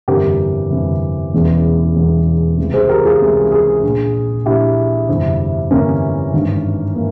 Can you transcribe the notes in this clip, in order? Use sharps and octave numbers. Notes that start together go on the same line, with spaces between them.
G1 F2 C3 E3 G4 A#4
G1 F2 C3 E3
E1 E2 C#3 E3
E1 E2 C#3 E3
C#2 C3 E3
G#4 C5
G4 A#4
F4 G#4
C#2 C3 E3
F4 G#4
A#1 A#2
A#1 A#2 E4 G4
G1 F2 C3 E3
G1 F2 C3 E3 A#3 C#4
G#1 G2 E3
E3 A#3